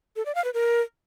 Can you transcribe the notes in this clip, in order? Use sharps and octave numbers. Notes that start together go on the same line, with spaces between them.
A4
D5
F5
B4
A#4